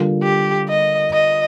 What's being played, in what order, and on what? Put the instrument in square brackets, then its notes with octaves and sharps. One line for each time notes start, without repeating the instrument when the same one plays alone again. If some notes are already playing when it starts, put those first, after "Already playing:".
Already playing: [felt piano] D3 G3 D4 F4 A#4
[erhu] G4
D#5
D#5